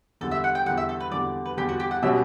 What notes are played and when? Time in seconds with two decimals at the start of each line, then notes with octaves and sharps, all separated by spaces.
0.21 E2 D3 G3 A4
0.31 E5
0.44 F#5
0.55 G5
0.66 E2 D3 G3 F#5
0.77 E5
0.89 A4
1.00 B4
1.11 E2 D3 G3 D5
1.46 B4
1.57 E2 D3 G3 G4
1.69 F#4
1.80 G4
1.91 F#5
2.03 B2 G3 C#4 F#4 E5